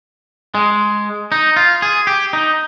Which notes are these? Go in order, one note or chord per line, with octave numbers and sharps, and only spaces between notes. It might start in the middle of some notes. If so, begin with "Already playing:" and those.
G#3
D#4
F4
G#4
G4
D#4